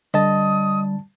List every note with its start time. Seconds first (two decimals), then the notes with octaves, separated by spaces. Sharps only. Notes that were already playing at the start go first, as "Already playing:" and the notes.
0.14 D3 G3 D#5 A5 D#6